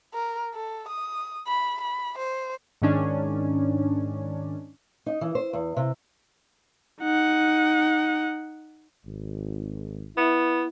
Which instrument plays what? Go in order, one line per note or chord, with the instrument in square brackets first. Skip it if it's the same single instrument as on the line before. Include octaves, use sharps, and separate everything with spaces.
[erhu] A#4
A4
D#6
B5
B5
C5
[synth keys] G#2 D#3 C#4 D4
[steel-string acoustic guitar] D#4
E3
C5
E2
C3
[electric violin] D#4 F#5
[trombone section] G#1
[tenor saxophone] B3 [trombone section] E4